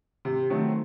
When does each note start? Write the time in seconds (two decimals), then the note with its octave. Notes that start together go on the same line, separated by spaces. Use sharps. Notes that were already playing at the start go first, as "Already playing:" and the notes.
0.25 C3
0.50 D#3 F#3 A3 C4